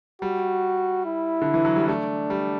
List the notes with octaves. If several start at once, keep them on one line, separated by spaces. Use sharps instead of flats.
G3 F#4
E4
D3
E3
F#3
G3
A3 D4
G3